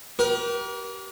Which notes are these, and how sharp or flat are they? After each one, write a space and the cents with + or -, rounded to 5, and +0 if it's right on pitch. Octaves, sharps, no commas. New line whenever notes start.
G4 -30 A#4 +35